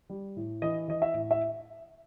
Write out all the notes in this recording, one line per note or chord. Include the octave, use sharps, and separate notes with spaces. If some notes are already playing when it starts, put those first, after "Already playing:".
G3
A2
E3 D#5
E3 D#5
E5
A2
E5